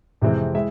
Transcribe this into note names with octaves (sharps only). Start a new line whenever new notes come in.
F2 C3 E3 G#3 C4
G#3 E4 E5